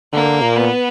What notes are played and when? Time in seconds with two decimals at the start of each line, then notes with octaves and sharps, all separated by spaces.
0.13 D3 A#3
0.42 A#2
0.57 B3